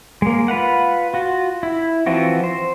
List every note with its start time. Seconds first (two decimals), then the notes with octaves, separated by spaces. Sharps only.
0.22 G#3 A#3
0.48 F4 B4 F5 F#5
1.14 F4 F#4
1.63 E4
2.06 E3 F3 C4 F4 F#4
2.44 C5